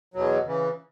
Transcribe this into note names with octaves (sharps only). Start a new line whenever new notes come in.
E2 B2 F#3
C#3 E3